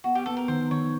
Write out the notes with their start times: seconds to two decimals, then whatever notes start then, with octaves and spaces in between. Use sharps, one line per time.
0.04 B3 F#4
0.15 G4
0.26 B3 A4
0.37 A#4
0.48 D#3 C5
0.71 D#3 C#5